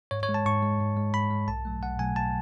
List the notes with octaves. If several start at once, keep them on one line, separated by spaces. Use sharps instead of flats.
G#2 C#5
C#5
G#3
A5
G#2 C#6
G#3
G#2
G#3
G#2 B5
G#3
B1 A5
B2 F#3 A3
B1 F#5
B2 F#3 A3 G#5
B1 A5